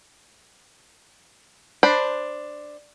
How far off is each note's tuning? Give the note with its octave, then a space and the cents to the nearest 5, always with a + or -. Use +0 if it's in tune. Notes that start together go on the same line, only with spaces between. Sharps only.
D4 +10 C5 +0 B5 +0